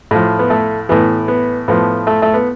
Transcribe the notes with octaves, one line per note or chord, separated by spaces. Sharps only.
A2 F3
B3
A3
A2 E3 B3
B3
A2 F3 B3
A3
A3
B3